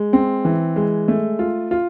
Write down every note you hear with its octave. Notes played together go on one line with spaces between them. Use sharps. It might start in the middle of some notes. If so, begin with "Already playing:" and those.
Already playing: G#3
C4
E3
G#3
A3
F4
F4